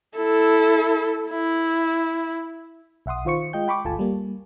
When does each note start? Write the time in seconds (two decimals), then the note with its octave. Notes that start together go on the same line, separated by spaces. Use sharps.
0.17 E4 A4
1.30 E4
3.06 B1 E5 F#5 C6 D#6
3.25 D#3 F4 C5 C#6 C#7
3.53 G#3 F4 D#5 G5 G6
3.68 G5 B5 C#6 D6
3.85 G1 D2 F4 A4 G#5 A5
3.99 G3 A#3